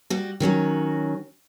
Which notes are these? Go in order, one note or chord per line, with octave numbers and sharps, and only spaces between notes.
G3 F#4
D#3 F#3 C#4 F#4